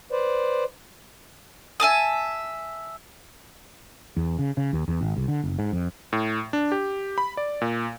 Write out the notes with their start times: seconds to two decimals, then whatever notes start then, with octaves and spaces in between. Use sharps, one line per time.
0.12 B4 C5 D5
1.80 E5 G#5 A5 D#6
4.17 E2
4.39 C#3
4.57 C#3
4.73 D#2
4.88 E2
5.01 G#1
5.16 C2
5.28 D3
5.44 F#1
5.59 G#2
5.72 F2
6.13 A2
6.53 D4
6.72 G4
7.18 B5
7.37 D5
7.61 A#2